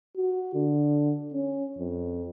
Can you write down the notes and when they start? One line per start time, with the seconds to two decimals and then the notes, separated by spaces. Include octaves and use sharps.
0.17 F#4
0.55 D3
1.34 C#4
1.79 F2